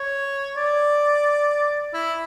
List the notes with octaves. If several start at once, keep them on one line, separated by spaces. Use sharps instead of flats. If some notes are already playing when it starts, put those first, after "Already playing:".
Already playing: C#5
D5
E4